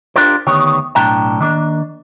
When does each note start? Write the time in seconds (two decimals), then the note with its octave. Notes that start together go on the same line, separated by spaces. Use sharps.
0.16 D4 F4 G4 A#4 C5
0.47 D2 D#3 B3 G4 C#5
0.95 B1 A2 D4 G5 A5 A#5
1.41 D#3 A#3 D4